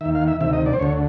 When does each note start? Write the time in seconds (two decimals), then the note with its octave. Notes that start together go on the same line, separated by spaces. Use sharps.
0.01 D#3 E5
0.05 D#2
0.15 F5
0.28 E5
0.40 D2 C3 D#3 E5
0.53 D#5
0.66 D5
0.73 C5
0.79 D2 D3 C#5